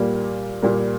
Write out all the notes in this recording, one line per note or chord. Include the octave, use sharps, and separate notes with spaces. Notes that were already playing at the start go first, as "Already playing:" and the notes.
Already playing: A#2 G3 A#3
A#2 G3 A#3